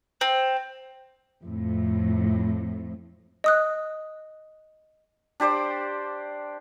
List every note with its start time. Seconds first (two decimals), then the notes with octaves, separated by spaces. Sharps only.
0.21 C4
1.42 F2 A2
3.44 D#5 D#6 F#6
5.40 D4 G4 C5 D5